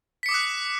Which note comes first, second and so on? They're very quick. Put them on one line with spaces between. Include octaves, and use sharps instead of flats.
B6 C#7 D6 D#6 F#6